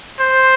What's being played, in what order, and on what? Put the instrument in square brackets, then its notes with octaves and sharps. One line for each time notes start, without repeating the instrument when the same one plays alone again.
[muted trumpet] C5